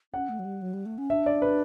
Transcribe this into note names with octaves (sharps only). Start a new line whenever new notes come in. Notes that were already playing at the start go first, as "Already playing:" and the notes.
C#4 F#5
A3
F#3
G3
F#3
G3
A3
C#4
D4 E5
D5
B4